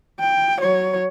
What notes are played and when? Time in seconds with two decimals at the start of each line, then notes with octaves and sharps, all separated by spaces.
0.20 G5
0.61 F#3 C#5